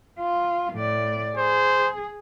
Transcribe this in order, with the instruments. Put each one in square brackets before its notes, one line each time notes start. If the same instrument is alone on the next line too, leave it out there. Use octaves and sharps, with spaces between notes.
[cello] F4
A2 D5
[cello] G#4 [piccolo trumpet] C5